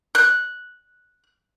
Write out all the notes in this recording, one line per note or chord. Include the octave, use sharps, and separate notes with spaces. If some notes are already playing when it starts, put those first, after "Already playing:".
F#6